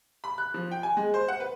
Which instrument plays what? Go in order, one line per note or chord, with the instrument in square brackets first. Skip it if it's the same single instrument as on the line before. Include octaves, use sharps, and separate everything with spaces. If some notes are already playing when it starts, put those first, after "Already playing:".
[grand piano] B5
F#6
F3
G5
G#5
G#3
C5
F#5
B4